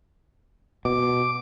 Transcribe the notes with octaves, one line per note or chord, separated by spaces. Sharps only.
B2 D6